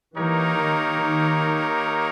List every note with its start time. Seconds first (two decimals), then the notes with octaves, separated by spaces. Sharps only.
0.14 E3 A#3 D#4 G4 A#4 C#5
0.59 D#3
1.03 D#3